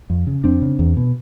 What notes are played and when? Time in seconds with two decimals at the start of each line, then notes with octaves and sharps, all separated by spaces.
0.10 F2
0.27 C#3
0.44 F2 C4 D4
0.62 C#3
0.79 E2
0.97 B2